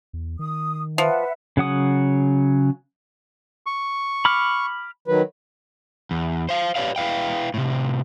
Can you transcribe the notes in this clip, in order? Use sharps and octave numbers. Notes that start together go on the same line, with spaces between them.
E2
D#3 D#6
F3 B4 E5 F#5
C#3 F#3 F#5 D#6
C#6
B5 D6 F6
D#3 F#3 B4
E2
C5 F5
G4 B4 C#5 D5 F5
E4 B4 F5 G5
A2 C3